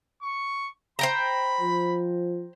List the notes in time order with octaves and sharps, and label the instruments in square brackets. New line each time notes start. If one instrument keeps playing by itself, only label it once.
[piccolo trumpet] C#6
[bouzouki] C5 G5 A#5 [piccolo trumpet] B5
[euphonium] F3